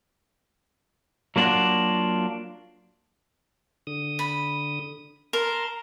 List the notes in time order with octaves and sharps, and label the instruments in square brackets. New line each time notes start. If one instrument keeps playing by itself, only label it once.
[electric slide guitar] F#3 A#3 D4 F4 F#4
[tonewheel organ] D3 D#6
[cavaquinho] B5
[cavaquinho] A#4 [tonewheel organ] A5 A#5 C6